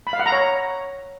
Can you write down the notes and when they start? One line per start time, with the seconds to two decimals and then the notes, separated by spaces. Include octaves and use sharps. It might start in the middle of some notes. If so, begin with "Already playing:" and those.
0.07 B5
0.13 F5
0.19 F#5
0.26 A#5
0.32 C#5